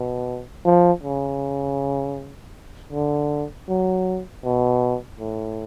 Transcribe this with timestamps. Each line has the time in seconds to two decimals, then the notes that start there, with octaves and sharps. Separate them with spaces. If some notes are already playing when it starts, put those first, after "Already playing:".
Already playing: B2
0.65 F3
1.03 C#3
2.92 D3
3.68 F#3
4.44 B2
5.20 A2